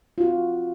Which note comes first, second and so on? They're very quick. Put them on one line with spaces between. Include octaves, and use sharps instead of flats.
F4 F#4 C4